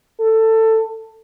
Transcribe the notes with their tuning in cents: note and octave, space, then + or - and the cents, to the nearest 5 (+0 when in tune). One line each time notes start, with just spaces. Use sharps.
A4 +15